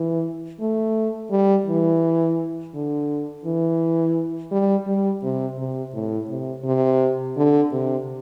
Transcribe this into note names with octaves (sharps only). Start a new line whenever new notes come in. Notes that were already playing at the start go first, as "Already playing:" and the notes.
Already playing: E3
A3
G3
E3
D3
E3
G3
G3
C3
C3
A2
C3
C3
D3
C3